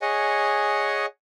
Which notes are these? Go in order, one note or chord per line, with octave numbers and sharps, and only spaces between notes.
G#4 C#5 D#5 F#5 G#5